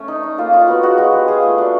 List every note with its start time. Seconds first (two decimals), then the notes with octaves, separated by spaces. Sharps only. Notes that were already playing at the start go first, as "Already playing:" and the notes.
Already playing: A3 C#4
0.08 D#4
0.23 D#4
0.38 A#3 F4
0.52 D#4 F4
0.68 B3 F#4
0.83 G#3 F#4
0.98 G#3 F#4
1.13 G#3 G4
1.28 F4 G#4
1.43 A3
1.58 D4 F#4